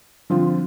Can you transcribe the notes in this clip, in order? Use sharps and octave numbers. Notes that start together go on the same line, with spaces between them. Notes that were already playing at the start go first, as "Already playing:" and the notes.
D3 F3 C4 F4